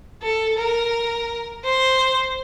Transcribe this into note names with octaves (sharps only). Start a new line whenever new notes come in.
A4
A#4
C5